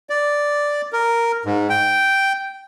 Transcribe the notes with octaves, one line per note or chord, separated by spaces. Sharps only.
D5
A#4
G#2
G5